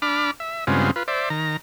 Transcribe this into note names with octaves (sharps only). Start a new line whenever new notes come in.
D4 B5 D6 F6
E5
G2 C#3 G#3 B3 C4 F4
F4 B4
C5 D5 E5
D#3 A#5